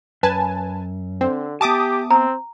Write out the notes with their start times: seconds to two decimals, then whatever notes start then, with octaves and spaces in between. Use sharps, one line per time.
0.23 F#2 B4 G#5 A5
1.21 D3 C4
1.61 B3 G4 E5 G#5 A5 D6 D#6
2.11 C4 A#5